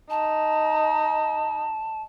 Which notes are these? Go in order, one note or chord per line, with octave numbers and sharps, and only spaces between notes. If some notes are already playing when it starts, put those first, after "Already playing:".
D#4 A5